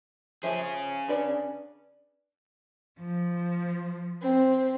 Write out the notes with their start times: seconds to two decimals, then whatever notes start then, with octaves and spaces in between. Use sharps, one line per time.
0.43 F3 C#4 G#4 E5
1.08 D4 B4 D5
3.00 F3
4.23 C4